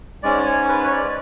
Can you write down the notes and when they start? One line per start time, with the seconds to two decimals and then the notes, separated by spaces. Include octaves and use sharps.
0.23 G#2 G#3 C#4 D5
0.45 C#5
0.69 B4
0.85 C#5
0.92 D5